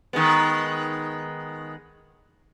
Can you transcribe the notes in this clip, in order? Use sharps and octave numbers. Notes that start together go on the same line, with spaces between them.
D#3 G#3 B3